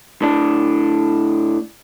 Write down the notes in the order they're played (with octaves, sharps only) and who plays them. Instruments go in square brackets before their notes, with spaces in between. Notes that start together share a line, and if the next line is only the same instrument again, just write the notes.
[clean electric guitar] A2 D4